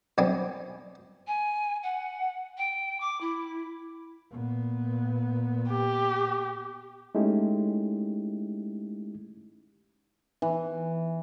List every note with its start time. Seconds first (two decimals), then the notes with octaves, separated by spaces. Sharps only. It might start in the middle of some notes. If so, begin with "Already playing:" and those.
0.18 B1 B3 C4 D4 G#5
1.27 G#5
1.83 F#5
2.58 G5
3.00 D6
3.21 E4
4.32 A#2 B3
5.70 G4
7.15 G#3 A3 C#4 D#4 E4 G4
10.42 E3